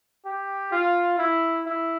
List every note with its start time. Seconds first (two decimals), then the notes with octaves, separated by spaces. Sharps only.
0.26 G4
0.72 F4
1.18 E4
1.66 E4